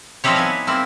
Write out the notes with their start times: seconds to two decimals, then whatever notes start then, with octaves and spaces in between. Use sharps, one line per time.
0.24 F3 C4 D#4 E4 G4 C#5
0.36 B3 G#5
0.67 A#3 C4 E4